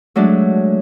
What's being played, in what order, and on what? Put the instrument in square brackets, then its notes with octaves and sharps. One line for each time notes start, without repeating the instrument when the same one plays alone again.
[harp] F#3 G#3 A3 D4